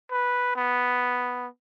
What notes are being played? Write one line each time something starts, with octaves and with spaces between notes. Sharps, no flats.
B4
B3